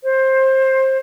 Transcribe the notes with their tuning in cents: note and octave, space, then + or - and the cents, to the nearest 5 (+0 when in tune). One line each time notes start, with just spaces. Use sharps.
C5 +20